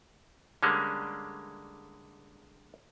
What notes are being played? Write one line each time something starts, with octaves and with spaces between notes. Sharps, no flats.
D3 G3 G#3 A#3 C#4